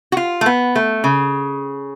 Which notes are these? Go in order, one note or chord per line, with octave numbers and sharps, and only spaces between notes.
F#4
F4
A3
B3
A3
C#3